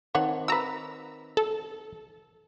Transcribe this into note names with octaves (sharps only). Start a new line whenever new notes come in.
D#3 C4 B4 C#5 F#5 A5
F#4 B4 A#5 E6
A4